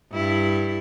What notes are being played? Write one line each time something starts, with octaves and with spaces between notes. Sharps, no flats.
G2 E4